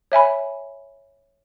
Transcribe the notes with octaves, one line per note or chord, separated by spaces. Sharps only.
C#5 E5 G#5 B5